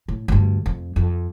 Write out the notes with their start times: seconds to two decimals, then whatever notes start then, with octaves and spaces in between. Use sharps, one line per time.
0.08 A2
0.28 D2 G2
0.66 F2
0.96 F2